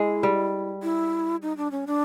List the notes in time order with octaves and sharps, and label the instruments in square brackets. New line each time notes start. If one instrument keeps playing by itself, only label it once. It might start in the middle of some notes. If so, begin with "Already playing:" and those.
Already playing: [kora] G#3 [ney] E4
[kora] G3
[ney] E4
D#4
D4
C#4
D4